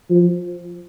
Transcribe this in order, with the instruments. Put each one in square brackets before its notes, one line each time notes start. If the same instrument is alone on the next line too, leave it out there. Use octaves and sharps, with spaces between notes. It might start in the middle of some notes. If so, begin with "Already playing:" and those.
[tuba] F3